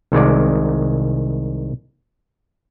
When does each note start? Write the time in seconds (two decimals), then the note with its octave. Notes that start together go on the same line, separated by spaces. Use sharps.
0.12 C2 D#3 G#3 D5